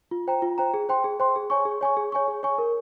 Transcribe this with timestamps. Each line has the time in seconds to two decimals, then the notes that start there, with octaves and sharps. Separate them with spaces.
0.11 F4
0.28 C5 G5 A#5
0.42 F4
0.58 C5 G5 A#5
0.74 G#4
0.89 C5 G5 C6
1.04 G#4
1.20 C5 G5 C6
1.36 G#4
1.50 C#5 G#5 C#6
1.65 G#4
1.81 C#5 G#5 C#6
1.97 G#4
2.12 C#5 G#5 C#6
2.28 G#4
2.43 C#5 G#5 C#6
2.58 A#4